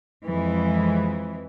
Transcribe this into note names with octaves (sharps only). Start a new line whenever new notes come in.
F2 E3 G#3